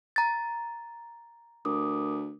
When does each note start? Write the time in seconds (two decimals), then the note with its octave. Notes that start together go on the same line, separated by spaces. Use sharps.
0.16 A#5 A6
1.65 D2 A#4 D6 D#6